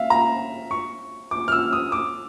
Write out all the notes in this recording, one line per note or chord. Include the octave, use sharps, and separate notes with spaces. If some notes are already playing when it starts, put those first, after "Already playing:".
Already playing: E5 F5
A#5
C#6
D6
F6
E6
D#6
D6